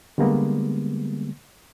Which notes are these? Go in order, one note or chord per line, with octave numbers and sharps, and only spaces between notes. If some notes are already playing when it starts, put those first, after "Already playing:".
D3 G3 G#3 A#3 B3